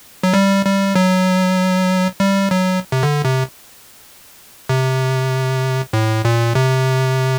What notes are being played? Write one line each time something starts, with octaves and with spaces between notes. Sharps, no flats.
F#3
G3
G3
F#3
G3
F#3
C3
D3
C3
C3
A2
A#2
C3